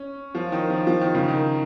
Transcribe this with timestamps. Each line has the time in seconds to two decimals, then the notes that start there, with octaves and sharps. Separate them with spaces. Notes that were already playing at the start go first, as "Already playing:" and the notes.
Already playing: C#4
0.35 F3
0.52 D#3
0.70 F3
0.87 F3
1.01 D#3
1.15 C#3
1.28 D#3